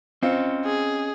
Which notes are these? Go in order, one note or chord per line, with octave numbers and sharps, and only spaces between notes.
C4 C#4 F4 D#5
G#4